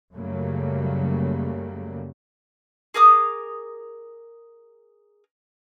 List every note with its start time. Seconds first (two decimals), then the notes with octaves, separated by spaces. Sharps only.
0.15 F#2 C#3 F#3 G3 A3 A#3
2.94 G#4 A#4 D6 D#6